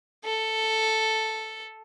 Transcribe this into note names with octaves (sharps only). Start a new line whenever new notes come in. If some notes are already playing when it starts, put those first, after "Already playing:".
A4